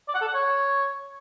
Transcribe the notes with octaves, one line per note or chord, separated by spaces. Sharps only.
D5
F#5
A4
F#5
C#5